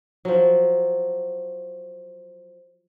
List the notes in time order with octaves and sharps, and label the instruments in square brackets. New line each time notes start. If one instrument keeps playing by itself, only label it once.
[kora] F3 F#3